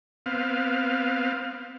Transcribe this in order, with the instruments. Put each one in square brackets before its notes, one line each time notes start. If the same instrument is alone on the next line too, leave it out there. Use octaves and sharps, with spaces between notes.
[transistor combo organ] B3 C4 F5